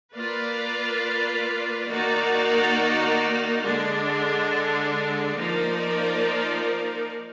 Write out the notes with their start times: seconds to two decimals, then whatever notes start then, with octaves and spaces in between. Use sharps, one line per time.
0.14 A#3 F4 B4 D5
1.88 D#3 A#3 D#4 F#4 D5
3.62 D3 G#3 D4
5.36 F3 A#3 D#4 A#4 D5